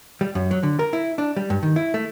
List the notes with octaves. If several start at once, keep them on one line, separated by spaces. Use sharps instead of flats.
G3
F#2
F#3
D3
A#4
E4
D4
G3
G2
D#3
E4
A3